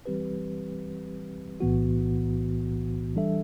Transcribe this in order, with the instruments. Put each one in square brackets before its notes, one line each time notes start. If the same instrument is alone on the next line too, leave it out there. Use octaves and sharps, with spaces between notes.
[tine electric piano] E3 G3 C4 G4 B4
B1 A2 E3 B3 F#4
E3 G3 D4 A4 E5